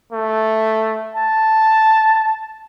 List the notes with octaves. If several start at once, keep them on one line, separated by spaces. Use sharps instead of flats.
A3
A5